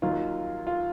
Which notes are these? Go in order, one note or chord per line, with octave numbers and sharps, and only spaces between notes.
D#2 D#3 F#3 F4
F4